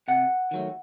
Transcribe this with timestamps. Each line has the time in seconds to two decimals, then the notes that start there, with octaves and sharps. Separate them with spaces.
0.08 C3 F#5
0.51 D#3 F#3 A3